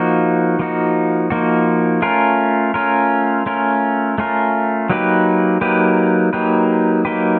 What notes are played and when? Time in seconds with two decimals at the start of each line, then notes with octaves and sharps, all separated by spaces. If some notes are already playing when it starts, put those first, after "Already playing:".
Already playing: F3 A#3 D#4 F#4
0.59 F3 A#3 D#4 F#4
1.30 F3 A#3 D#4 F#4
2.02 A3 C#4 F4 A#4
2.74 A3 C#4 F4 A#4
3.46 A3 C#4 F4 A#4
4.18 A3 C#4 F4 A#4
4.89 F#3 A#3 D#4 G4 B4
5.61 F#3 A#3 D#4 G4 B4
6.33 F#3 A#3 D#4 G4 B4
7.05 F#3 A#3 D#4 G4 B4